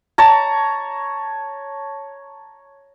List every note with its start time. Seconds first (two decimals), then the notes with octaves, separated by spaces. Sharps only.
0.18 C#5 A5 A#5